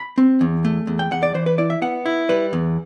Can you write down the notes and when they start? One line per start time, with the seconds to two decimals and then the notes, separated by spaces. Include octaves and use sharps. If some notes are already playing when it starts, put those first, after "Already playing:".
Already playing: B5
0.18 C4
0.41 E2
0.65 A3
0.87 E2
0.99 G5
1.11 E2 F#5
1.23 D5
1.34 E3 C5
1.46 B4
1.58 E4 D5
1.70 E5
1.82 B3 F#5
2.06 E4
2.29 G3 B4
2.53 E2